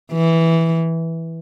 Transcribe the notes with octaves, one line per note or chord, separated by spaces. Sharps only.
E3